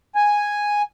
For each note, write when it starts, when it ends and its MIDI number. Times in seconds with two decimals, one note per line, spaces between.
0.15 0.82 80